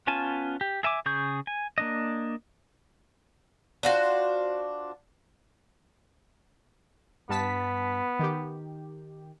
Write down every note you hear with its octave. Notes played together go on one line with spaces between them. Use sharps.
B3 C#4 F4 G#5 A5
G4
G#4 E5 G#5 D6
C#3 G#4 C#6 G6
G#5
A#3 D4 D#5
D4 F4 F#4 C5
G2 B3 A5 B6
D#3 G4